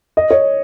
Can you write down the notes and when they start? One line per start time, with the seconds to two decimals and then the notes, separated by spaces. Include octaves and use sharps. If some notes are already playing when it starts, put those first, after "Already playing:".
0.17 D#5
0.31 C#5